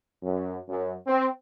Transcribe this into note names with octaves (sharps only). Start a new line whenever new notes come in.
F#2
F#2
C4